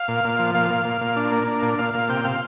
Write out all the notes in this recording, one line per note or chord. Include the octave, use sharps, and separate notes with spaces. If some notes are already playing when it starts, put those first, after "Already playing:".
Already playing: F5
A#2
A#2
F3
A#2 F5
A#2
A#2
A#2
D4
A#3
D4
A#2
A#2 F5
A#2 F5
C3 G5
C3 F5